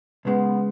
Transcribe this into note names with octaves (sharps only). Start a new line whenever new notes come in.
C#2 C#3 G#3 B3